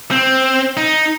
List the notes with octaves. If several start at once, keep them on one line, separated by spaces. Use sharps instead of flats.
C4
D#4